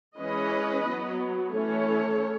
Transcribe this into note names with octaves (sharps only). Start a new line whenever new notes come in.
E3 G#3 C#4 B4 D#5
F#3 B3
E3 A3 C#4 A4 C#5